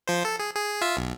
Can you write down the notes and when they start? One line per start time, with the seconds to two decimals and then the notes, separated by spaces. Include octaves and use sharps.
0.07 F3 C5
0.25 A4
0.39 G#4
0.55 G#4
0.81 F4 E5
0.97 B1